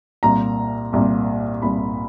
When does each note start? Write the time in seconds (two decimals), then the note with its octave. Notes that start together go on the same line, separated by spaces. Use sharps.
0.23 C2 A#2 A#5
0.93 C2 A#2 A#5
1.62 C2 A#2 B5